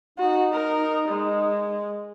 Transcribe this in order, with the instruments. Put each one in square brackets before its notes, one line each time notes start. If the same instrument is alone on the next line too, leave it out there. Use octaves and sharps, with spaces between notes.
[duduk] D#4 [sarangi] F#4
[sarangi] A#4
G#3